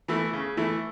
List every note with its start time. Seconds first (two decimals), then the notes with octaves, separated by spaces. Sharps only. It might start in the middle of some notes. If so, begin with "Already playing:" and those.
0.08 E3 A3 E4
0.33 C#3
0.57 E3 A3 E4